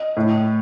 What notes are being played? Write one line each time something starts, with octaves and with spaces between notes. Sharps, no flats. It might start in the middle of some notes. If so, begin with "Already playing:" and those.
Already playing: D#5
A2